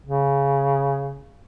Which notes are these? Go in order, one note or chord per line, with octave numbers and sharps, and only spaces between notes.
C#3